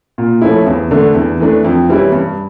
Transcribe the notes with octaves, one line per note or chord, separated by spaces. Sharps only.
A#2
F3 A3 C#4 E4
E2
D3 A3 D4
E2
E3 A3 D4
F2
E3 G3 C#4 E4
G2